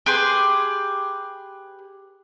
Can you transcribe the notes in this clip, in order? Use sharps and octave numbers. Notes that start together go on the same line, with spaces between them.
G4 G#4 B4 C6